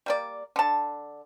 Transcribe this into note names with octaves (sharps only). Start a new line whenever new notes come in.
G3 A#3 D5
D3 A5